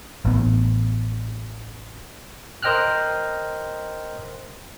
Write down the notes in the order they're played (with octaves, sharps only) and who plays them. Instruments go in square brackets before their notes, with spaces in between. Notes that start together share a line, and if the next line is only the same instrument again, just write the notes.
[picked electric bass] A1 B3
[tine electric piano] A#4 C5 D#5 G5 F6 F#6